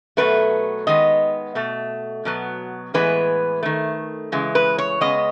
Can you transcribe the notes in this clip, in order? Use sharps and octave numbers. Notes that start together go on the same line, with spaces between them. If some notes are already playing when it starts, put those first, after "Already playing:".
B2 F#3 A3 B4
D#3 G#3 B3 D#5
B2 A3
B2 F#3 B3
A2 E3 G#3 B3 B4
D#3 A3
C#3 E3 G#3
B4
C#5
C#3 G#3 B3 D#5